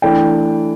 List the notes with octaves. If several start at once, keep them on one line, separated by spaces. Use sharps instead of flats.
E3 A3 D4 G5